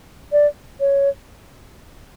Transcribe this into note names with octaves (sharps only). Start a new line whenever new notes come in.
D5
C#5